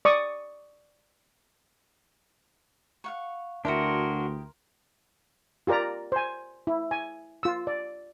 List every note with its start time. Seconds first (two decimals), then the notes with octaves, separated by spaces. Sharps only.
0.05 D5 C#6 D#6
3.04 F5 F#5 C#6
3.65 D2 D4 E4 F#4 G4 A#4 C6 D#6
5.67 F4 G4 A#4 D5 A#5
6.12 C5 G#5
6.67 E4
6.91 G#5
7.43 F4 E6
7.67 D5